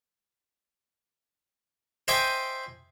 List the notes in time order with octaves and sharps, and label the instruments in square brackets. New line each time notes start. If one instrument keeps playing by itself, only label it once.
[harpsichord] C5 D#5 E5 G5 G#5 D6